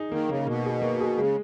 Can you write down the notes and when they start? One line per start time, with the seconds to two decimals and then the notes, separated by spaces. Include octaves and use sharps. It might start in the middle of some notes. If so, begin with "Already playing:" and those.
Already playing: D#4 G#4
0.11 D#3 A#3
0.29 C#3 A#3
0.46 B2 A#3
0.65 G#4
0.81 A#3
1.00 G#4
1.18 C#3 G#3